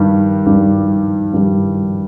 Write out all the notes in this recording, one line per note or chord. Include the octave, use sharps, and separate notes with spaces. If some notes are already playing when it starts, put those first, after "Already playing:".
Already playing: G2 D#3 G3
G2 D#3 G3
G2 D#3 G3